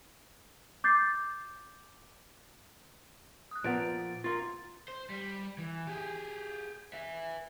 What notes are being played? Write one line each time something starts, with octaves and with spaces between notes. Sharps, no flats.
D6 G6 A6 C7
D#6 F#6
A#2 F3 B3 F#5 A6 D7
A#3 F4 C6 A6
C5
G3
E3
G4 G#4
B4 E5